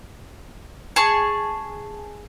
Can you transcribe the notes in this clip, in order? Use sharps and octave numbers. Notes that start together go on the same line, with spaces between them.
G#4 A5 C#6